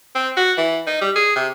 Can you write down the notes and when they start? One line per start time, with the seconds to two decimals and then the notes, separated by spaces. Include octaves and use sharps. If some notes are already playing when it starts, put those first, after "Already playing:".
0.15 C4
0.37 F#4
0.57 E3
0.87 D#4
1.01 G3
1.15 G#4
1.35 C3